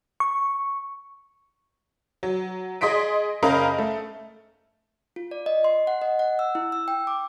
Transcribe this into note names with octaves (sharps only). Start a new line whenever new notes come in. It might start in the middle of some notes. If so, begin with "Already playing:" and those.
C#6
F#3
G#4 D#5 C6 B6 D7
F#1 C#4 A#4 D#5 F5 B5
A3
F4
D5
D#5
C6
F#5
D#5
F#5
E6
E4
E6
G5
D6